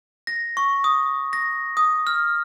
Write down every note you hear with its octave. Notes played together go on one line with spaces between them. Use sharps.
A#6
C#6
D#6
A#6
D#6
F6